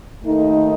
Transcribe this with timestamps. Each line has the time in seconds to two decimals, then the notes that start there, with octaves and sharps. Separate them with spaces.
0.23 D#2 D#3 A3 D#4 A4